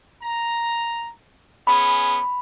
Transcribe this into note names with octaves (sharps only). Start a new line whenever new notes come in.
A#5
B3 C#4 G#4 B5